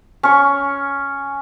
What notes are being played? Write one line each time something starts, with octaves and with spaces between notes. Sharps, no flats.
C#4 C#6